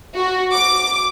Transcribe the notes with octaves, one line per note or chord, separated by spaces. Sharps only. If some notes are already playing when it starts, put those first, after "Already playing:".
F#4
D6